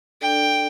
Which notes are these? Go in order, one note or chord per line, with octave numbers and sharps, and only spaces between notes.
D4 A4 D5 G5